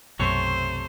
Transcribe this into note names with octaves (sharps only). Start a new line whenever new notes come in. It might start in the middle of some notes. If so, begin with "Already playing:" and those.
B1 F#2 C3 A3 C5 C#5